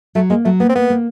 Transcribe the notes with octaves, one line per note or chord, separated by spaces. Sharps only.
F#3 A3
G#3 A#3
F#3 A3
A#3 B3
C4
A#3 B3
A#3